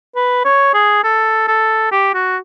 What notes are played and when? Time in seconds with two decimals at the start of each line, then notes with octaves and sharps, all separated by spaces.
0.15 B4
0.45 C#5
0.74 G#4
1.04 A4
1.48 A4
1.92 G4
2.14 F#4